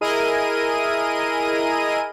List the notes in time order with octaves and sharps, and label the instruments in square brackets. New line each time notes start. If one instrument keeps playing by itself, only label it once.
[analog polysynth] E4 G#4 A#4 D#5 D#7